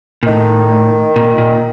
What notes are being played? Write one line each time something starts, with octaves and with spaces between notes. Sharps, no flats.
A#2
A2 D#3
A#2
A#2